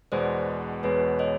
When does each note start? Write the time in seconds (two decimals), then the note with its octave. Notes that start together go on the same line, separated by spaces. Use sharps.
0.12 E2 B2 G#3 B3 C5 D5
0.83 E2 B2 G#3 B3 B4 C#5
1.19 C#5 D#5